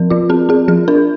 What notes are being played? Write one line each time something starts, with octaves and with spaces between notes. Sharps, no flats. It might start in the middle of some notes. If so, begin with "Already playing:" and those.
Already playing: F3 C4 A#4
F3 F4
C4 G#4
C4 G#4
F3 G#4
D4 A#4